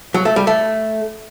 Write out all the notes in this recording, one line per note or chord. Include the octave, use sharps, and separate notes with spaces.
F#3
A3
G3
A3